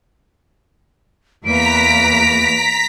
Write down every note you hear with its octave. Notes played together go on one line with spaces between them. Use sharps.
E2 A#3 B4 A#5 B6 D7